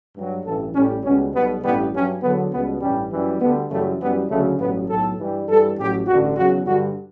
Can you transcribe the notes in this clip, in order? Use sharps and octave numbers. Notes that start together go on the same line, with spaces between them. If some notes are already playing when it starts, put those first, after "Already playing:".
G2 F#3
A1 G2 E3 A4
A1 A2 G3 C#4
C#2 B2 G3 C#4
B1 B2 G3 B3
A1 G2 E3 G3 B3
G2 F#3 C#4
E2 D3 F#3 B3
C#2 B2 G3 B3
A1 G2 E3 G3 C#4
F#2 E3 G3
D2 D3 G3 B3
F#2 C#3 E3 G3 A3
F#2 E3 G3 B3
D2 C#3 F#3 A3
A1 G2 F#3 B3
B1 A2 F#3 A4
G2 E3 G3
G2 E3 G3 A4
A1 A2 F#3 G4
A1 G2 D3 F#4
E2 C#3 F#3 F#4
G2 D3 G3 F#4